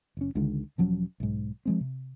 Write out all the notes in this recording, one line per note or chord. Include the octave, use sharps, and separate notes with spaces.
F#1 C#4
C#2 D3 D#3 G#3
E1 F3 F#3 C#4
B1 G#2
F3 G#3 C4
C3